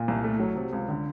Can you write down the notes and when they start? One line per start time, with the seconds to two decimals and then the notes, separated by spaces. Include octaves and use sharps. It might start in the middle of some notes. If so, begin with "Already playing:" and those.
Already playing: A#2
0.08 C2
0.24 A3
0.40 F#3
0.56 C3
0.73 C#2
0.89 D3